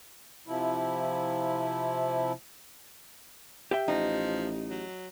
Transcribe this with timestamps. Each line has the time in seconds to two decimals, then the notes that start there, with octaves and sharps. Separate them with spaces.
0.47 C3 F3 E4
3.71 G4 E5 G5
3.88 A1 F3 D#4
4.70 F#3